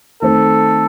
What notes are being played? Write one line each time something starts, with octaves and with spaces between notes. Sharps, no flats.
D#3 A3 C4 A4